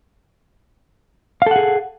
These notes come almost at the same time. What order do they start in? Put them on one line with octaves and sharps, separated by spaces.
F5 A4 F#5 G#4